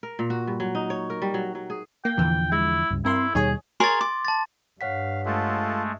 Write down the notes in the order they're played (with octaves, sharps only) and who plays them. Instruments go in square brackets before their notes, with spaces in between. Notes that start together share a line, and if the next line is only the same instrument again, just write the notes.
[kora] A#4
A#2
F#4
G2
F#3
D#4
C#5
A#4
G3
F#3
F#3
G#4
[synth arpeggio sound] A#3 [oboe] G5
[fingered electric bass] E2 D3 F3 [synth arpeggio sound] A#2 E3
[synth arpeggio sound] G#3 [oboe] E4
[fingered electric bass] C#2 G2
[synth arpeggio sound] G2 A#4 C6 [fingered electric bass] C4 [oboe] E4
[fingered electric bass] D#2 B2 G3 [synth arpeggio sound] D#4 C#5 G#5 [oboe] G#4
[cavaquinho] G#4 A#4 C#5 [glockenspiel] C6 A6
[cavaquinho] D6
[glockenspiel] A5 A6
[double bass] G2 [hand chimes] C#5 F#5 B6 [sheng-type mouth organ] F5
[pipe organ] G#3 A3 [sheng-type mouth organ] F4 A4